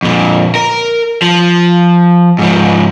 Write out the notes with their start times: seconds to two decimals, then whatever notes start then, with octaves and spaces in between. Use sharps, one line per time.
0.02 F2 A#2
0.55 A#4
1.22 F3
2.39 G#2 F3